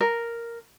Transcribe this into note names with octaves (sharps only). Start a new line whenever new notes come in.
A#4